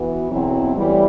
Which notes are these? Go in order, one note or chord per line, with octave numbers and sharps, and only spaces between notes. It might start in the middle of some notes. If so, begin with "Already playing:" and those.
Already playing: E3 B3 F#4
E2 B2 F#3 C4 E4
A2 E3 G3